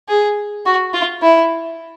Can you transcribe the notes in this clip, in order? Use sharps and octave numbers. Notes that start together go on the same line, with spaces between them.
G#4
F#4
F4
E4